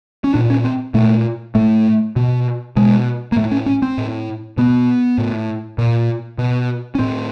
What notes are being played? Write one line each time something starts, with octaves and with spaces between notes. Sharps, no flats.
C#4
A#2 D4
C#4
C4
A#2 A3
A2 A3
B2
B2 G#3
A#3
A2 A3
C#4
C#4
C4
A2
B2 B3
A2
A#2
B2
C#4
A2 C4